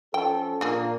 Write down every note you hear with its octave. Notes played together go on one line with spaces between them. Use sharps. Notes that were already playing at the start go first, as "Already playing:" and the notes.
F3 C#4 A4 G5
A#2 A#3 D4 G#4